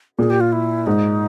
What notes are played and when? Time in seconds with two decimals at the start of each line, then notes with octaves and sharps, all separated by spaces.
0.18 A#2 G#4
0.30 G4
0.41 F4
0.52 E4
0.86 G#2 D#4